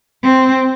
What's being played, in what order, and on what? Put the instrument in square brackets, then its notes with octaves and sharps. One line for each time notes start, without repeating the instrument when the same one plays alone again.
[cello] C4